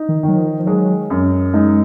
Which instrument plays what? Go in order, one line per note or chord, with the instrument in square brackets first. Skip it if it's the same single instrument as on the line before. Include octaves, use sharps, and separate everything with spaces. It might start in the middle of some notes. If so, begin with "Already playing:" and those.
Already playing: [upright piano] D#4
[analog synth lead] D#3
[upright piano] D#3 [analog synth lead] F#3
[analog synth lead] F3
F3
[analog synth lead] F#3 [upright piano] G#3
[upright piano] F#2
[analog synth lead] G#3 [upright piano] D#4